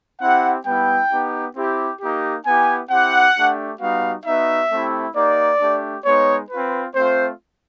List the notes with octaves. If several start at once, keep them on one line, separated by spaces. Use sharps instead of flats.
C4 E4 G4 F#5
G3 B3 E4 G5
B3 D#4 G4
C4 E4 G4
A#3 D#4 G4
B3 E4 G4 G#5
C4 E4 G4 F#5
A3 D4 G4
G3 B3 D#4 F#4 F5
B3 D#4 F#4 E5
A3 C4 E4 G4
A#3 D#4 G4 D5
A3 D4 G4
G#3 B3 D#4 C#5
C4 F4 B4
A3 C4 F4 C5